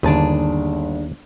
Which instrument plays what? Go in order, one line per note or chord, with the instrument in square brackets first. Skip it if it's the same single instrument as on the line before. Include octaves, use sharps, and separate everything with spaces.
[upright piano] G1 [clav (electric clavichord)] D#2 A5 [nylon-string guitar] D4 G#4